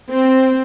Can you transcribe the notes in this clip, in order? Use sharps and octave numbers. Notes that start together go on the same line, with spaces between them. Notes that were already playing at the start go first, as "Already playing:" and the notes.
C4